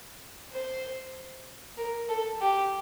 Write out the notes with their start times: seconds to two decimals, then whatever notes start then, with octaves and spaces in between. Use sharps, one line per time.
0.51 C5
1.77 A#4
2.09 A4
2.41 G4